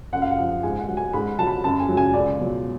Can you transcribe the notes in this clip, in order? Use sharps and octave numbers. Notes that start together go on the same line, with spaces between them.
F#2 F#5
F5
F#5
F3
G#2 G#5
F#5
F#3
G#5
G#2 B5
F#3 A5
B5
F#2 A5
G#5
C#3 F#3
G#5
C#2 D5
B2 F#3